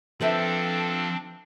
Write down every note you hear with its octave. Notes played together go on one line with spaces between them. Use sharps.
F3 C4 D4 A4 B4 C5 E5